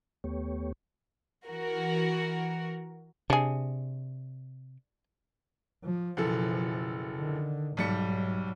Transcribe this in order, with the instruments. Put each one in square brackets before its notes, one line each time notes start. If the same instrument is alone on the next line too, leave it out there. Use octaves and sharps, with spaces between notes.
[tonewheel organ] D#2 A3 B3 G4 C#5
[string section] E3 F#4 A#4
[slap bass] C3 [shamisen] D4 G#4
[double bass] F3
[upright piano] F#1 E3 A4 [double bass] B2 F3
[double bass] D3 D#3
[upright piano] B1 G3 C#7 [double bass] G#2 F#3